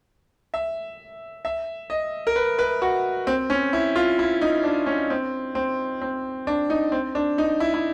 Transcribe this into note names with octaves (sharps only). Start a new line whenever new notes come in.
E5
E5
D#5
A#4
B4
B4
F#4
C4
C#4
E4
F4
E4
D#4
D4
C#4
C4
C4
C4
D4
D#4
C4
D4
D#4
E4
E4